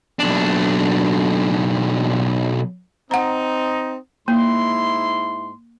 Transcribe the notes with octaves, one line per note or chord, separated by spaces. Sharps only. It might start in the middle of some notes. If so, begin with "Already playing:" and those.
B1 D4
C4 D#4 F#5 A#5
G#2 A#3 E4 C6